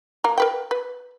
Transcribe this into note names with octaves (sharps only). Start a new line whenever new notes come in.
A#3 A#4
A#4 B4 G5
B4